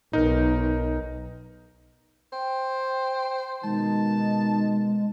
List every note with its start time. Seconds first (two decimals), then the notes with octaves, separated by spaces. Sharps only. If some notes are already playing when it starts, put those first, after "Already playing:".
0.13 B1 D#4 A#4
2.32 C5 G5
3.64 B2 D#3 G#3 D#4 A5